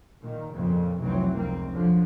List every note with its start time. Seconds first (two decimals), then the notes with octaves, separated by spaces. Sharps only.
0.20 A#2 D#3
0.53 F2 A#2 C#3
0.99 F1 C2 E3 F#3 C4
1.35 F1 C#2 F#2 A#3 C4
1.71 F#2 D3 F3